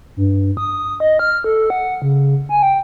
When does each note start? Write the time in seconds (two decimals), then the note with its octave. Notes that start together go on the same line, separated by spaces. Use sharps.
0.16 G2
0.57 D#6
1.00 D#5
1.19 F6
1.44 A4
1.70 F#5
2.02 C#3
2.49 G#5
2.63 G5